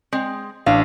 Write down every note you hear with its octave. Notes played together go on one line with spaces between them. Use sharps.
G#3 C4
A1 D4 F5